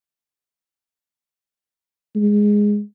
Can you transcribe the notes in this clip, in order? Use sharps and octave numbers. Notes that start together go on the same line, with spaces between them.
G#3